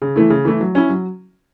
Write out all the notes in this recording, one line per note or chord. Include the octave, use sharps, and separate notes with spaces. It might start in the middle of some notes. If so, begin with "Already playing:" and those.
C#3
E3 A3 E4
C#3
E3 A3 E4
F#3
C#4 E4
F#3